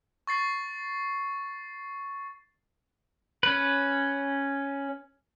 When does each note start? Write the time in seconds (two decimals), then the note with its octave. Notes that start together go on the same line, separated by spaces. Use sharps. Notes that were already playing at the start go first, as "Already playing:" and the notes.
0.27 C#6 A6 C7
3.43 C#4 B4